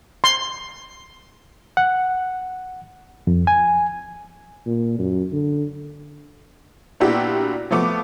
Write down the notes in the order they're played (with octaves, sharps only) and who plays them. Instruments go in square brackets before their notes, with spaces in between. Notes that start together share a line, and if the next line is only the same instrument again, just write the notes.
[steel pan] C6
[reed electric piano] F#5
F2
G#5
[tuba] A#2
F#2
D3
[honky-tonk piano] A#2 B3 D4 E4 F#4 G4
F3 A3 B3 D6